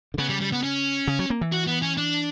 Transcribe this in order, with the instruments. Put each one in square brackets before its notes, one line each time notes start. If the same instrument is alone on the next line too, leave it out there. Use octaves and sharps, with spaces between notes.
[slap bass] D3
[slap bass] C#3 [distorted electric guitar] B3
[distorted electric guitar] G3
G3
B3
C#4
[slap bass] C#3
F#3
A#3
E3
[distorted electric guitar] F#4
B3
C#4
D4